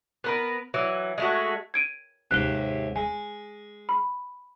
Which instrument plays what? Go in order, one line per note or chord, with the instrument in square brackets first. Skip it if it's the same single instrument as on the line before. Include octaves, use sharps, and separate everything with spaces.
[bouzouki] B3 A#4 B4
E3 F#3
G#3 A3 F#4
[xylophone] G#6 D7 D#7
[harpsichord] D#2 G#2 C3 [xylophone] F#6 G7
[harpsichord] G#3 [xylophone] G#5
[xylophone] B5